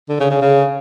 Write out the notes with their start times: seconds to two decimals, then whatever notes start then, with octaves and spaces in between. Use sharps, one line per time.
0.09 D3
0.20 C#3
0.30 C#3
0.42 C#3